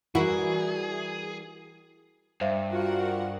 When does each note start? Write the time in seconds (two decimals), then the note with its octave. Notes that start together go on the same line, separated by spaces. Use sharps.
0.15 E3 G3 E4 F#4 G#4 A#4
2.41 G2 C5 E5 F5
2.71 F4 F#4 A#4 F#5